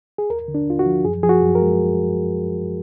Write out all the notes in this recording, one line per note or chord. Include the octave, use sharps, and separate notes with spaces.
G#4
D#2 A#4
D3
D4
D#2 F4
F#4
F3
F#2 G#4
F3 G#4
F#4
F#2
A#4
G#3